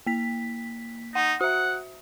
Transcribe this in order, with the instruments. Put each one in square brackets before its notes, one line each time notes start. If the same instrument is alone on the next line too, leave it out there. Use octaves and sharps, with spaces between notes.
[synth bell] A#3 B6
[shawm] D#4 [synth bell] F#5
[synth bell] F#4 E5 [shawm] F#5